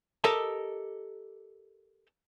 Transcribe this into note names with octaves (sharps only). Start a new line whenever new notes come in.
G4 A4 A#4 D#5 E5 A5